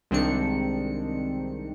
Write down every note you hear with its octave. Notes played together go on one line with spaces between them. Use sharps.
C2 D#3 G#3 C4 D4 C#7